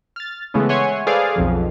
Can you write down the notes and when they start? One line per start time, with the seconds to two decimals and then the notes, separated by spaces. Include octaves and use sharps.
0.16 F6 A6
0.54 C#3 E3 G#3 A3 B3 C#4
0.69 C#5 E5 F#5 G#5 C6 C#6
1.07 G#4 A4 B4 C5 D5 F5
1.36 B1 F2 F3